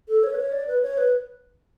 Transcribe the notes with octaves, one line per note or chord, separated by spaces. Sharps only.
A4
C#5
B4
C#5
D5
B4
C#5
B4